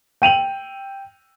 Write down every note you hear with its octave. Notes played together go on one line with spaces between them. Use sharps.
G5 D#7 F7 F#7